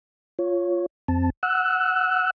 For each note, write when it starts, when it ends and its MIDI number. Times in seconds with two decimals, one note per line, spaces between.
0.39 0.86 65
0.39 0.86 73
1.08 1.30 41
1.08 1.30 60
1.08 1.30 81
1.43 2.30 78
1.43 2.30 88
1.43 2.30 90